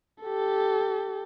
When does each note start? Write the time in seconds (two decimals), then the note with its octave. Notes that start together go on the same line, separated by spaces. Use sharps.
0.23 G4 A4